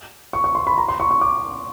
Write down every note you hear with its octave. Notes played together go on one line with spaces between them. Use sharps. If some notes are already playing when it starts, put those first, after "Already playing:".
C#6
C#6
C6
B5
A#5
C6
C#6
C#6
D6